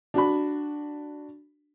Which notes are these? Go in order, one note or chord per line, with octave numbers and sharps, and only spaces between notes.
D4 F#4 B5